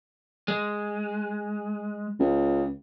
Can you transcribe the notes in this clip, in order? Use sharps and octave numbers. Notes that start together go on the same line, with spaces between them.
G#3
C#2